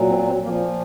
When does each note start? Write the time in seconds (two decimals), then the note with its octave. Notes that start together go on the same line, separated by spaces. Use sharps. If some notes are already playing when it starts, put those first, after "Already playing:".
Already playing: A#2 F#3
0.09 C4
0.26 C4
0.44 A#2 F3 A#3
0.61 A#3